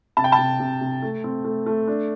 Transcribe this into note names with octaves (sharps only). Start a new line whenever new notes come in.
C3 A5
G5
A5
C3
C3
C3
A3
C4
A3
A3
D4